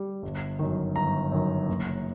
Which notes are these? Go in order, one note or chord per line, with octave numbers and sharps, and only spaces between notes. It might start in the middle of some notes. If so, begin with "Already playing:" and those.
Already playing: G3
G1
F#2 D#3
G1 A#5
F#2 D#3
F#1